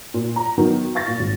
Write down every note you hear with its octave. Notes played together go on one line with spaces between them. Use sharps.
A#2
A#5
D#3 F#3 B3
F5 C#6 A6 A#6
A#2
G#1